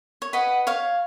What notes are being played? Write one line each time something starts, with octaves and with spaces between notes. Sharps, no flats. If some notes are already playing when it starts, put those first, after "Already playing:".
C#5
B4 D#5 F#5
C#5 F5